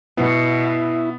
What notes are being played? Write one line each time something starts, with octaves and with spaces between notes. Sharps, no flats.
B2 B3 E4